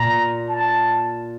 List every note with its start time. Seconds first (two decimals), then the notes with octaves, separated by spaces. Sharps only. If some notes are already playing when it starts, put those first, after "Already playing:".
Already playing: A#2 A#5
0.49 A5